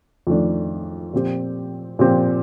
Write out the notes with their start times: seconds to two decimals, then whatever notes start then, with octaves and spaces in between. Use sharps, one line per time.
0.27 F2 D#3 A3 D4
1.13 A#2 F3 C4 G4
1.99 A#2 F3 C4 G4